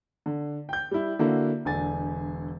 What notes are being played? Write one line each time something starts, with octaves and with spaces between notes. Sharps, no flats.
D3
G5 G6
G3 E4
D3 A#3 E4 F#4
E1 D3 G#5 A6